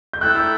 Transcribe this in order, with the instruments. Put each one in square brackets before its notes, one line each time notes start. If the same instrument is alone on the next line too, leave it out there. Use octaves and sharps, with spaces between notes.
[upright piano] G6
[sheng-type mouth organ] A3 E4 A4 E5 G5 [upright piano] F#6
[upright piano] E6